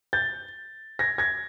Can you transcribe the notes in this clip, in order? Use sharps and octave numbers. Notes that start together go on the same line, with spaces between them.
G6 A6
G#6 A#6
G#6 A#6